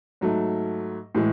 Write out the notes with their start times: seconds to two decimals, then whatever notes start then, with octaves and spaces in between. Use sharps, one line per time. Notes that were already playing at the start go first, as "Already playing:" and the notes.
0.21 G#2 F#3 A3
1.15 A2 E3 G#3